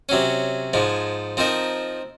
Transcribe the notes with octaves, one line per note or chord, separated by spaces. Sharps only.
C3 F#3 C#4
G#2 F3 G#3
F3 C4 D#4 A#4